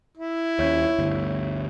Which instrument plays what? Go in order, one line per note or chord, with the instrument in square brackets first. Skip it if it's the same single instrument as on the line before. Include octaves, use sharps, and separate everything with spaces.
[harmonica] E4
[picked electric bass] D#2 C#4 [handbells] C#5 E5 G6
[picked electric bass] G1 D2 G2